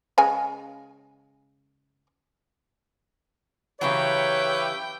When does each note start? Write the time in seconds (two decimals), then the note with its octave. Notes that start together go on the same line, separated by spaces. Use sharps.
0.18 C#3 G#3 G#5
3.81 C#3 E3 F#3 G4 B4 C#5 E5 G5